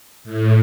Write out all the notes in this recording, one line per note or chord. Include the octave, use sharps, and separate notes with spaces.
A2